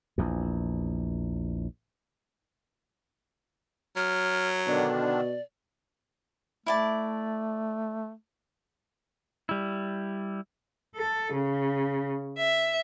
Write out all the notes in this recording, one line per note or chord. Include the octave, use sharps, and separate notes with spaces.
A#1 E2
F#3 F6
B2 D3 D#3 D4 D5
A3 E4 D5 A5
G3 E4
A4
C#3
E5